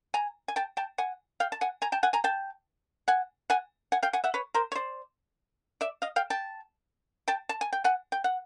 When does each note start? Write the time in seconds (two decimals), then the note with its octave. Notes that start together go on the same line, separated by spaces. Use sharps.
0.14 G#5 A#5
0.48 G#5
0.56 G5 A5
0.77 G5 A5
0.98 F#5 G#5
1.40 F5 G5
1.52 A5
1.61 F#5 G#5
1.82 G#5 A#5
1.92 G5 A5
2.03 F#5 G#5
2.13 G#5 A#5
2.24 G5 A5
3.08 F#5 G#5
3.50 F#5 G#5
3.92 F#5 G#5
4.03 F5 G5
4.13 F#5 G#5
4.24 E5 F#5
4.34 B4 C#5
4.54 A#4 C5
4.72 C#5
4.75 C5 D5
5.81 D5 E5
6.02 D#5 F5
6.16 F5 G5
6.30 G5 A5
7.28 G5 A5
7.49 A5
7.61 G#5
7.73 G5
7.84 F#5 G#5
8.12 G5
8.24 F#5